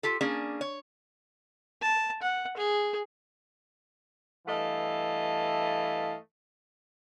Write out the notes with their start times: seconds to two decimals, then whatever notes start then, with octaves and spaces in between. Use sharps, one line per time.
0.03 F4 G4 A4
0.21 A#3 C#4 D4 G#4
0.61 C#5
1.82 A5
2.22 F#5
2.57 G#4
4.47 G2 E3 A3 D#5 F5 A5